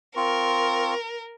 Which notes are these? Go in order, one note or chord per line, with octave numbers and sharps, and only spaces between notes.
C4 F4 A#4 C#6